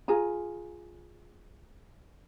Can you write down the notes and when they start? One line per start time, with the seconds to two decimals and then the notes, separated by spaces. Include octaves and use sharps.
0.08 F4 G#4 G#5 A#5